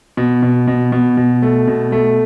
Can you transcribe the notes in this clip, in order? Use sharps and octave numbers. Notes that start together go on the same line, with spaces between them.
B2
B2
B2
B2
B2
A3
B2
A3